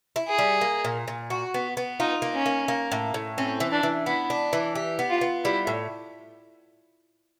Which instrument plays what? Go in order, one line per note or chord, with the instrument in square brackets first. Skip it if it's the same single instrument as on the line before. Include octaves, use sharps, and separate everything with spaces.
[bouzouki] E4
[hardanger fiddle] G#4
[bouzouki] G3
A#3
A#2
A#2
F#4
B3
B3
[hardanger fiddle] D#4 [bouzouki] F4
[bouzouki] A#3
[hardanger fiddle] C#4
[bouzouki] A#3
A#3
A2
A2
[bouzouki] C4 [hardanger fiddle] C#4
[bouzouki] E3
[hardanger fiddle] D4
[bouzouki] E3
[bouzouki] B3 [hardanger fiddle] E4
[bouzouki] D4
E3
G4
B3
[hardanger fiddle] F4
[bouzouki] B3
[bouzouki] G3 [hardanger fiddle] E4
[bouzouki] A2